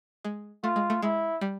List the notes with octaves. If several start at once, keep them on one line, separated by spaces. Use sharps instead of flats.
G#3
A3 F4
G#3
A3
G#3 E4
G3